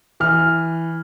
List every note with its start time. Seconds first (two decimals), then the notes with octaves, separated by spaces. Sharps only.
0.20 E3 F6